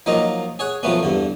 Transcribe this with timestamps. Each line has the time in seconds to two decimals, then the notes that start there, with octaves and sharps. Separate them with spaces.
0.06 F3 F#3 A#3 D#4 F4 D#5
0.59 G#4 C#5 F#5
0.83 F3 F#3 A3 B3 C#4
1.03 E2 G2 D3